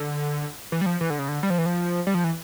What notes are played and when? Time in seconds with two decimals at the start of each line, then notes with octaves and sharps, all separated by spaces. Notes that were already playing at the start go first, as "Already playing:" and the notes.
Already playing: D3
0.72 E3
0.81 G3
0.86 F3
1.01 E3
1.10 D3
1.19 C#3
1.28 D3
1.43 G3
1.50 F3
1.58 E3
1.66 F3
2.07 G3
2.14 F3
2.24 E3